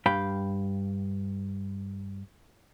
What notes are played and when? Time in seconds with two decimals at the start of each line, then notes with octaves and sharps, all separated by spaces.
0.06 G2 F5 G5 B5